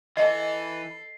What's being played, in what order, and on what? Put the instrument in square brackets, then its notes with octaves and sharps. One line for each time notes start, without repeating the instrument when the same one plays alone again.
[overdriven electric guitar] E3 [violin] A4 [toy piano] D#5 [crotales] C7